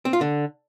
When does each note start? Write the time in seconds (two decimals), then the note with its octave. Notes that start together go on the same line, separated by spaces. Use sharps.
0.05 C4
0.13 F4
0.21 D3